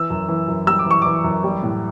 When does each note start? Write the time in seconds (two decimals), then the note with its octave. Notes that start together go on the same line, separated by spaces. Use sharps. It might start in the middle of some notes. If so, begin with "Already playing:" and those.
Already playing: E3 E6
0.10 F#2
0.29 E3
0.48 F#2
0.67 G3 E6
0.79 D6
0.86 E3 C#6
1.02 E3 D6
1.24 F#2
1.44 G3
1.63 A2